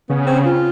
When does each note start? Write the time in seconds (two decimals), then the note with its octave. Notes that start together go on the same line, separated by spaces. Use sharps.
0.09 C#3 B3
0.26 C4
0.45 F4